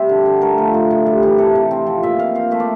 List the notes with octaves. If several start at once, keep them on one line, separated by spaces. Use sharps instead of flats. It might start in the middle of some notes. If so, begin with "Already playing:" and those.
Already playing: G3 C4 E5
D3
D3
A3 A#4
F3
A2
A2
G3
E3
C3 A4
C3
C4
F3
A#2 E5
A#2 F5
C4 F5
A3 E5
D5